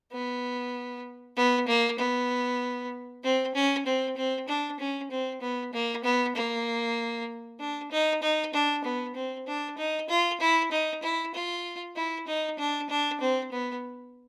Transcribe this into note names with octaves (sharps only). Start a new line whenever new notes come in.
B3
B3
A#3
B3
C4
C#4
C4
C4
D4
C#4
C4
B3
A#3
B3
A#3
D4
D#4
D#4
D4
B3
C4
D4
D#4
F4
E4
D#4
E4
F4
E4
D#4
D4
D4
C4
B3